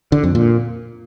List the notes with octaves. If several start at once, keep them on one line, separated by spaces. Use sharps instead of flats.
D3
F2
A#2